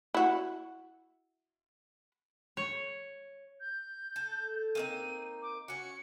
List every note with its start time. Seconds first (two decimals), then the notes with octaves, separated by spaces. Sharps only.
0.14 E4 F#4
2.57 C#5
3.60 G6
4.16 A4
4.75 A#3 C4 D#4 D#7
5.42 D6
5.68 C#4 F#4 C#7